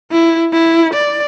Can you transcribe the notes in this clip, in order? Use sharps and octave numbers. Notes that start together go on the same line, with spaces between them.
E4
E4
D5